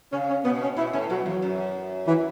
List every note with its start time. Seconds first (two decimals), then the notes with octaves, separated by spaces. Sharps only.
0.12 C#3 C#4
0.29 C#4
0.45 B2 B3
0.61 C#4
0.77 B2 E4
0.93 A2 C#4
1.10 B2 F#3
1.26 E2 F#3
1.42 F#2
2.07 E3